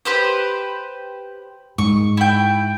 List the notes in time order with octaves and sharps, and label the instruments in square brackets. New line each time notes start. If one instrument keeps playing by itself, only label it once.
[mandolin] G4 B4 C5
[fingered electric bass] G#2 [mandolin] C#6
[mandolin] E4 G5